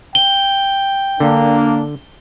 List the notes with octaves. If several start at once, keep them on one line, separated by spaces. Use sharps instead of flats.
G5 G7
D3 A#3 D4